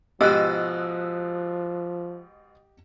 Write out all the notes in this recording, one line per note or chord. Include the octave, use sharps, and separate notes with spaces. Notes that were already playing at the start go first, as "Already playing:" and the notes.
G#2 B2 F3 G4 D#5 E6 F#6